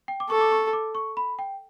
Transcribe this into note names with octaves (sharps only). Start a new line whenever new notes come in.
G5
D6
A4 C#6
D6
C#6
D6
C#6
B5
G5